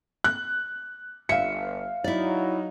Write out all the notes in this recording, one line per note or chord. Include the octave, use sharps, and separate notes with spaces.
F#6
G1 E5 F5 C#7
F#3 D#4 E4 D5